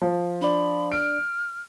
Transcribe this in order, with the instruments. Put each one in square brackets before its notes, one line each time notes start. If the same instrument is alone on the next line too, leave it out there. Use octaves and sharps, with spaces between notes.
[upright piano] F3
[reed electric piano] D4 D5 [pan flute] B5
[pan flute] F6 [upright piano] D7